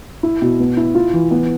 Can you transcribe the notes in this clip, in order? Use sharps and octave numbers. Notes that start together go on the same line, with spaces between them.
E4
B2
B3
E4
F4
E3
B3